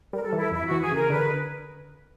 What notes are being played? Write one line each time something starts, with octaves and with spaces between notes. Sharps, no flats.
G3 A#4
A4
E3
E4
F2 E4
E3 F#4
G#4
C#3 A#4
D3 B4